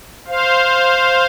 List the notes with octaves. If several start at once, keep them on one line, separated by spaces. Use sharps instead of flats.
C5 F5